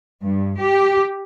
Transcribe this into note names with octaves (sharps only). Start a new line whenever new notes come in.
G2
G4